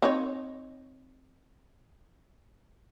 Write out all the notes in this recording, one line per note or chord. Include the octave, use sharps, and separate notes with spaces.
C4 D#4 C#5